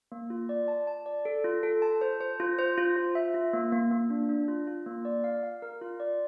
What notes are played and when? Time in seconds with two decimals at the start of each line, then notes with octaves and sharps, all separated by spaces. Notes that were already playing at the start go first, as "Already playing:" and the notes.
0.12 A#3
0.30 F4
0.49 D5
0.68 A5
0.87 A5
1.06 D5
1.25 A4
1.44 F4
1.63 A4
1.82 A5
2.01 C5
2.21 C5
2.40 F4
2.59 C5
2.78 F4
2.96 F4
3.15 E5
3.34 F4
3.53 A#3
3.72 A#3
3.91 A#3
4.10 D4
4.29 D4
4.48 F4
4.67 F4
4.86 A#3
5.05 D5
5.24 F5
5.43 F5
5.62 A#4
5.81 F4
6.00 D5